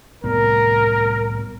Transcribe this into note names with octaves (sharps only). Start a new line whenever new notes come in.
C2 A2 B3 A#4